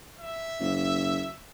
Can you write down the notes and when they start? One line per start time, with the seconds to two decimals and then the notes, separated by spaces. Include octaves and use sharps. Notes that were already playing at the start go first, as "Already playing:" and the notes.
0.21 E5
0.60 F#1